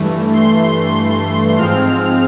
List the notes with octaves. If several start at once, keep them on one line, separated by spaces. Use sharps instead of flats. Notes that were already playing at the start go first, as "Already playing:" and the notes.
Already playing: G2 E3 A3
C6
C6
G#2 F3 G#3 C4 F6